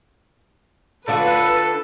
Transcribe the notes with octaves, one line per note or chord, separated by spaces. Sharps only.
D3 F4 F#4 A4 B4